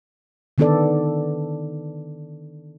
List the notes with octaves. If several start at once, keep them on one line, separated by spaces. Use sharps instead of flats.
D3 D#3 B3 D4 A4 D5